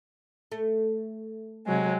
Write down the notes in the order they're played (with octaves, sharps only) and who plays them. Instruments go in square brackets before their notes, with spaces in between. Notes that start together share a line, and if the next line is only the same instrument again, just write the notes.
[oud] A3
[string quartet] C3 F#3 G#3